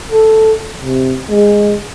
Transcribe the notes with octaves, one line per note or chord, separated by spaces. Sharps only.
A4
C3
G#3